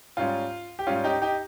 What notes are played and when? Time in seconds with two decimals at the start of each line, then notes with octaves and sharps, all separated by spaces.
0.17 G#2 G3 C#4 F4
0.79 G4
0.87 G#2 G3 C#4 F4
1.04 D#4 G4
1.22 D#4 G4